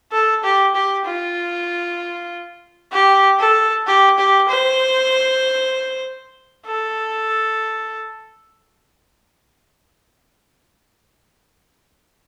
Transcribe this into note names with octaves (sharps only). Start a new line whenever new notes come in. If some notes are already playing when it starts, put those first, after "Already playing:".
A4
G4
G4
F4
G4
A4
G4
G4
C5
A4